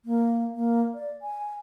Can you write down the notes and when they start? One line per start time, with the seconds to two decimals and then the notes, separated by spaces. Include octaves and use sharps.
0.05 A#3
0.54 A#3
0.94 D5
1.22 G#5